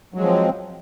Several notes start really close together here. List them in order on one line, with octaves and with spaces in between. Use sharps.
F#3 G#3 F3 C4